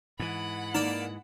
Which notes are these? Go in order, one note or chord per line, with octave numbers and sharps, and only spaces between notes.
G#2 E3 F#5 B5
A#3 D#4 D5 A5